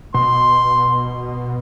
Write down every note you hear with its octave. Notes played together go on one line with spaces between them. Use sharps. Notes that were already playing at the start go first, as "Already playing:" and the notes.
B2 C6